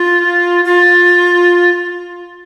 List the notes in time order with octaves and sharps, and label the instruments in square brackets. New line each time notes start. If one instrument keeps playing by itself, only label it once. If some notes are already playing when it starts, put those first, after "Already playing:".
Already playing: [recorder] F4
F4